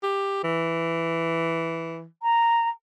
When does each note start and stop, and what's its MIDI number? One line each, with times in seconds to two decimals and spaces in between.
0.03 0.42 67
0.44 2.05 52
2.22 2.69 82